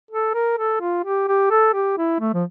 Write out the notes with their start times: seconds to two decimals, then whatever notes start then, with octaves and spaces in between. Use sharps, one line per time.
0.11 A4
0.34 A#4
0.58 A4
0.81 F4
1.04 G4
1.28 G4
1.50 A4
1.74 G4
1.98 E4
2.20 A3
2.34 F3